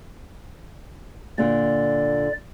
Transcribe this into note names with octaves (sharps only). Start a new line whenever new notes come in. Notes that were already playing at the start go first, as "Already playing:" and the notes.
A#2 D3 D5